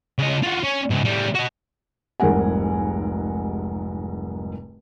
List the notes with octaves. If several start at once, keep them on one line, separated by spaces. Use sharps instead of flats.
C#3 D#5
F4 F#4
C#4
C#2 G#2
A2 G3
F#4 D#5
F1 C2 G#2 A#4 F#5 G#5